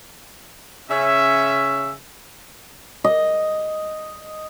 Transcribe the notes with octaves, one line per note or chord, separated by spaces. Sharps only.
C#3 C#4 E5
D#5